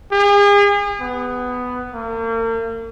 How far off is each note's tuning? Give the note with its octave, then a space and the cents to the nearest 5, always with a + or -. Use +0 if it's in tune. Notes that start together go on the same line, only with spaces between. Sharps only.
G#4 -40
B3 +10
A#3 -40